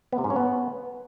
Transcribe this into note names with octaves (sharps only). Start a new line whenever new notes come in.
B3
C3
G#2
C#4
B3